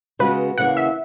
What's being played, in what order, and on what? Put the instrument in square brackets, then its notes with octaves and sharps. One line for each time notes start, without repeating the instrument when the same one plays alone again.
[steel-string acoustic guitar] C#3 G#3 B3 F#4 [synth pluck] B4
[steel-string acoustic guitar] E2 C#3 E3 A#3 [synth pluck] F#5
[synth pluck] E5